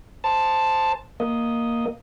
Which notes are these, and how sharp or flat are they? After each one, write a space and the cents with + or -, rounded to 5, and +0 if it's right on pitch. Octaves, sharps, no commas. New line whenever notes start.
C5 +0 A5 +0
A#3 +0 D#5 +0